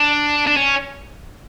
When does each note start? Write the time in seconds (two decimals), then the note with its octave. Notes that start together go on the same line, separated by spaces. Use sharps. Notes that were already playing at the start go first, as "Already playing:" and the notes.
Already playing: D4
0.47 D4
0.56 C#4